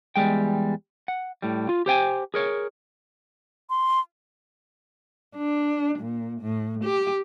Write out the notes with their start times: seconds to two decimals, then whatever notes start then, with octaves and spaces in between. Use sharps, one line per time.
0.16 E2 E3 G3 G#3 G5
1.08 F#5
1.42 A2 G3
1.69 F4
1.86 G4 C5 G5 G#5
2.34 G#4 A#4 C#5
3.70 C6
5.37 D4
5.99 A#2
6.41 A2
6.84 G4